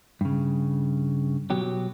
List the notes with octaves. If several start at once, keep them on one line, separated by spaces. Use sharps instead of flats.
G2 C#3
B2 F#3 G4